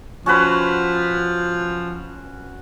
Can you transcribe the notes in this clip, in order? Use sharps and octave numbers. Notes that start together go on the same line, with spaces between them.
F3 C#4 F#4 B4